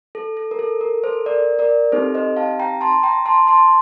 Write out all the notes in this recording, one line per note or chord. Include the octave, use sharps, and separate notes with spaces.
A4
A4
A#4
A4
A#4
A4 C5
A#4 D5
A#4 D5
C4 D#4 G4 A4 C5
C5 D#5
F5 A5
G5 A#5
A5 C6
G5 A#5
A5 C6
A5 C6